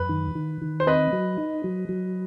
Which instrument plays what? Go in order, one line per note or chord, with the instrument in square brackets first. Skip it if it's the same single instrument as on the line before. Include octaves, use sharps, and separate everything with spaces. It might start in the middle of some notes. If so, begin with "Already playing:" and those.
Already playing: [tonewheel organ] F#2 [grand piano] B4
[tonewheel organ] D#3
D#3
D#3
[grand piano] C5
[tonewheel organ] C4 [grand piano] B4 D#5
[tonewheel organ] F#3
D#4
F#3
F#3